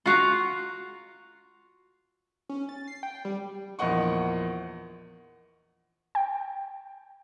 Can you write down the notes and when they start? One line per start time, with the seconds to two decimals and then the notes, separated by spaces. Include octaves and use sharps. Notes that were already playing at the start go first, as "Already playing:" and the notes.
0.06 F4 F#4 F5 A#5
2.49 C#4
2.69 A6
2.88 C7
3.03 G5
3.25 G3
3.79 A#1 E2 A#3 D#5 F#5 C#6
6.15 G5